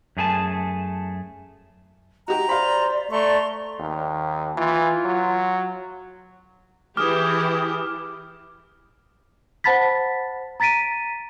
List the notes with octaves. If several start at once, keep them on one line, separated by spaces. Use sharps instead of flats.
F#2 A3 G#4 G#5 A5
F#4 G4 D#5 A#5
C5 D5 F5 B5
A3 D5 A#5 C6 C#6
D#2
E3 F4
F#3
E3 G4 G#4 D6 F6
C5 F#5 A5 B5 A6 B6
A#5 A6 B6 D7 D#7